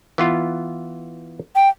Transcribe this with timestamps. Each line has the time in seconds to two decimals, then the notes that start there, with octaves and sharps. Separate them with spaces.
0.18 E3 B3 F4
1.56 G5